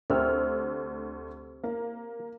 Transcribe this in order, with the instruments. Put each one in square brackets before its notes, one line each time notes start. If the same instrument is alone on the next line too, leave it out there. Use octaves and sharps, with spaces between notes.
[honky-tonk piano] D2 E6 F6 [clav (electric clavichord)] C3
[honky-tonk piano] A#3